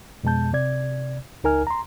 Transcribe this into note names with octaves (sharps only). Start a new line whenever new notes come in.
F2 B2 G#3 A5 G6
C3 D5 G#6
C#2 D#4 A#4 G#5 F6
A#5 C6